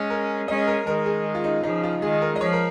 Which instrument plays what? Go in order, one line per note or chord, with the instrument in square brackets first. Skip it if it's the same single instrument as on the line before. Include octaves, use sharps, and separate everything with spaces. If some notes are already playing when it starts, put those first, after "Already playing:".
Already playing: [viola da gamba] G#3 C#4
[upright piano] A#4
[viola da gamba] G#3 C#4 [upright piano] D#5
[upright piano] A#4
[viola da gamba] D#3 G#3 [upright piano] A#4
[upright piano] G#4
F4
D#4
[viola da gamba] C#3 F3 [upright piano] D#4
[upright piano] F4
[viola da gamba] D#3 G#3 [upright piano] G#4
[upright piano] A#4
D#5
[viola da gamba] F3 [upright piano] C#5
[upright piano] A#4